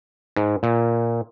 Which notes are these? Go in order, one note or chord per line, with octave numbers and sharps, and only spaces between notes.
G#2
A#2